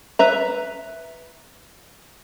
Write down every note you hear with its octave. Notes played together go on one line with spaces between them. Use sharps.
B4 E5 A#5